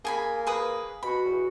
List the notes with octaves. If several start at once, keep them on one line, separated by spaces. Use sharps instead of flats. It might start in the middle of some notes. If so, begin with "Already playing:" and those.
A#3 G#4 G#5 B5
G#4 B4 D#6
B2 F#4 B5
E2